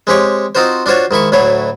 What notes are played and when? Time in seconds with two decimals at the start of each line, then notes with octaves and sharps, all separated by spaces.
0.07 G#3 C4 G4 C#5
0.55 C4 D#4 F4 F#4 C5
0.86 D4 F4 F#4 C5 C#5
1.11 G#2 D#3 E4 C#6
1.32 D2 A2 F#3 E4 C#5